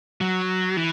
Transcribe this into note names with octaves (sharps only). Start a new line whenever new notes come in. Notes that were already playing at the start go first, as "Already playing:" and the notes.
F#3
E3